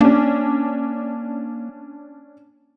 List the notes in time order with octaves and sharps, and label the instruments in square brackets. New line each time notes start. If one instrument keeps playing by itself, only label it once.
[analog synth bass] A#3 [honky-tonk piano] C#4 D4